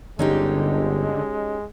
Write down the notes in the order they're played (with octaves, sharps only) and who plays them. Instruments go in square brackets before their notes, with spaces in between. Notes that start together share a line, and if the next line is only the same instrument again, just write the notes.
[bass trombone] G1 [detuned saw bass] D3 [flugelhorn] G#3 [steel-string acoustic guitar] C#4 D#4 G4